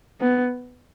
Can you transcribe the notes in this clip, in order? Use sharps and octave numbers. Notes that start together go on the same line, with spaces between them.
B3